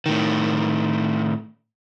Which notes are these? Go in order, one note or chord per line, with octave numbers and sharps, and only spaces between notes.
A2 D#3